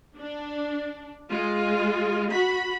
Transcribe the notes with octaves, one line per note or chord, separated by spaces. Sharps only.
D4
G#3 F4
F#4 B5